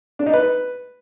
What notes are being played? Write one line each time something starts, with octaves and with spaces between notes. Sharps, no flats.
D4
D#4
B4